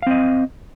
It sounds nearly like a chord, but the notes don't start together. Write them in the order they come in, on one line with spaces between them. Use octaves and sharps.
F5 C4 D#5